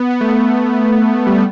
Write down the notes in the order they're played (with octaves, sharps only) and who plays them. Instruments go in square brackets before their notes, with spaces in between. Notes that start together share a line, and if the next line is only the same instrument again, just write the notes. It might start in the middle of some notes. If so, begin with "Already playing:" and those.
Already playing: [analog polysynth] B3
B3
A3
G3
A3